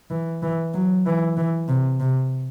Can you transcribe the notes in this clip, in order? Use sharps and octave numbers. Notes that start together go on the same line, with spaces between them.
E3
E3
F#3
E3
E3
C3
C3